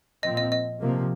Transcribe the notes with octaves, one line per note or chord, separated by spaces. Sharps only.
A#2 F3 C4 D#5
D#5
D#5
C3 F3 A#3